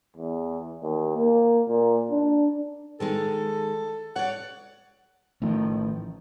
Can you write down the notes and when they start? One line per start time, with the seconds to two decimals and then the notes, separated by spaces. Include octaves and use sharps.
0.16 E2
0.82 D#2
1.16 A#3
1.68 A#2
2.11 D4
3.00 D#3 G#3 D#4 A4
4.16 C#5 D5 F#5
5.42 A1 A2 D#3 F3